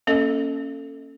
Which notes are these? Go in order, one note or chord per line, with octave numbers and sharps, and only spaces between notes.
A#3 C#4 A4 D#5